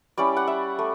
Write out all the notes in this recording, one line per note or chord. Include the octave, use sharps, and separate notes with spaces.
G3 C#4 E4 D5
F#5
E5
A3